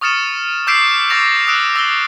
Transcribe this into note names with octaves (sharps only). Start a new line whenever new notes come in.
C#6 D#6 F6 A6 C#7 E7
D6 E6 G6 B6 C7 D7
C#6 D6 A6 A#6 F7
D#6 E6 F#6 D7 E7
E6 A#6 G7